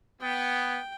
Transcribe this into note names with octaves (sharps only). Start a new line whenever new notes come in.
B3 G5